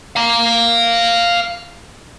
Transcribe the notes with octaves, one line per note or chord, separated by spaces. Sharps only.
F5 A#5